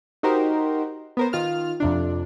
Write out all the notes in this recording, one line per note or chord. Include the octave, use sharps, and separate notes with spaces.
D#4 F#4 G4 A#4 C5
B3 A#4 C5
D#3 F4 F6
F2 C3 D4